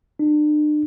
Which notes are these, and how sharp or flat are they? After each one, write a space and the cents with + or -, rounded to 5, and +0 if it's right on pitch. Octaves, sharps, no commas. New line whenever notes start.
D4 +40